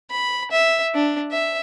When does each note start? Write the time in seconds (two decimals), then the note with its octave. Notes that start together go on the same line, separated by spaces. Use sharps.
0.11 B5
0.51 E5
0.94 D4
1.31 E5